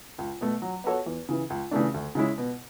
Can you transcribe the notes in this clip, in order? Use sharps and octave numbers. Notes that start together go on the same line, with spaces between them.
C#2
B2 A3
F#3
B3 F#4 A4 C#5
E2
C#3 E3
C#2
C#3 E3 A3 D4
D2
C#3 G#3 C#4 E4
B2